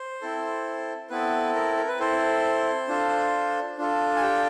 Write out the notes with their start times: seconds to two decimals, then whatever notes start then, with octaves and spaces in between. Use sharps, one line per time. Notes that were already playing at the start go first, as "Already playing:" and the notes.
Already playing: C5
0.21 C4 E4 A4
1.10 B3 C4 E4 A4 B4
1.54 A#4
1.77 A#4
1.87 B4
2.00 C4 E4 A4 C5
2.88 D4 F4 A4
3.78 D4 F4 A4
4.16 G#5
4.21 G4 G5